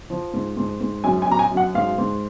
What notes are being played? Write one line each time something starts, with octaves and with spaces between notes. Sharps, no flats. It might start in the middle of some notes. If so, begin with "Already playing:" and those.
F3
G#2
G#2
G#2
F#2 G#5
G#5
F#2 A#5
G#5
F#2
F#5
G#2 F5
G#2